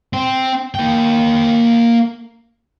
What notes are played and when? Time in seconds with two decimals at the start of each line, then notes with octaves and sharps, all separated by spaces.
0.13 C4
0.75 A#3 G5